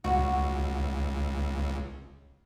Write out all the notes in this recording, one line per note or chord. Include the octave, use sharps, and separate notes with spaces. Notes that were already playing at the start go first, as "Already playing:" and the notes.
C#2 F#4